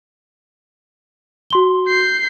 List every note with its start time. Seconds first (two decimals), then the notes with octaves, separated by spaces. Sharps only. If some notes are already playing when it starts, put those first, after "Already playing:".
1.50 F#4 C6 G7
1.88 G6 C7